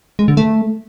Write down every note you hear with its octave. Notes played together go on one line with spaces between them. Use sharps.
G#3
D3
A3